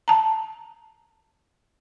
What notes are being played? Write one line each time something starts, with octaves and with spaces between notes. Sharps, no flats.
A5 A#5